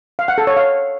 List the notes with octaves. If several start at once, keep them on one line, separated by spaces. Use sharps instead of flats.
F5
F#5
A4
C#5
F5